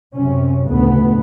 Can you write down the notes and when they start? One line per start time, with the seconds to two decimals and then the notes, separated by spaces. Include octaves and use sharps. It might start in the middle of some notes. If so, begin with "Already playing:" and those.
0.14 F#2 C3 C#4
0.67 F1 D2 A2 C#3 B3